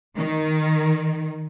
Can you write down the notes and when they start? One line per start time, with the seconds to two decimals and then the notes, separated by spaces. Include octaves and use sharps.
0.18 D#3